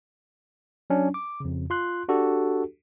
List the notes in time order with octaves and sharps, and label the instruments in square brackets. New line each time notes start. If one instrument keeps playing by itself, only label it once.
[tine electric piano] F#3 C#4 D4
D6
F2 C#3
F4 C6 F#6
D4 F#4 G4 A4